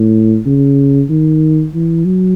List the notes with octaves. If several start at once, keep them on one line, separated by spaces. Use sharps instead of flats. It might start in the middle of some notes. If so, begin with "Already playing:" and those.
Already playing: A2
C#3
D#3
E3
F#3